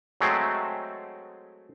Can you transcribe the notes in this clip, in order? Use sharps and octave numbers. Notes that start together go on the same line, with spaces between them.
F#3 G#3 A3 C4